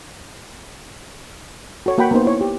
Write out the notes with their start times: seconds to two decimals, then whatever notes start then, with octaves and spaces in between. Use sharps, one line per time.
1.86 F#4 A4 C#5
1.98 A#3 F#4 F#5 G5 B5
2.11 A#3 B3 D#4 C5
2.25 E4 C#5
2.41 G4